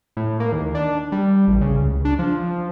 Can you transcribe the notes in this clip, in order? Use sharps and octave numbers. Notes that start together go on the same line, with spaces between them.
A2
A#3
D#2
D4
G3
A1
C#3
C#2
D4
F3